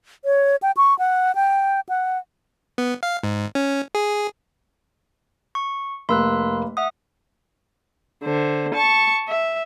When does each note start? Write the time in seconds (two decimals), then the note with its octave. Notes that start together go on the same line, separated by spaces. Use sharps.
0.25 C#5
0.62 G5
0.77 C#6
0.99 F#5
1.35 G5
1.89 F#5
2.78 B3
3.03 F5
3.23 G#2
3.55 C#4
3.95 G#4
5.55 C#6
6.09 F1 A#3 B5 C6 E6 F#6
6.77 E5 F#5 D#6
8.24 D3 C5
8.74 A5 C#6
9.28 E5